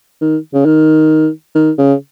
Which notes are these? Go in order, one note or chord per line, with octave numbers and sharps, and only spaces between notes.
D#3
C#3
D#3
D#3
C#3